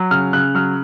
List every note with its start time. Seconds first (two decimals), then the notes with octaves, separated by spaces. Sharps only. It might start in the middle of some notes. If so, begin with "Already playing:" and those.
Already playing: F#3
0.11 C#3 F6
0.33 C#3 F#6
0.55 F#3 F6